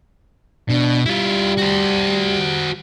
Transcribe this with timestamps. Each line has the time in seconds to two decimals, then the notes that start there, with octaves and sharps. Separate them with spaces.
0.69 B2 D4
1.06 G3 E4 F4
1.57 F#4 C5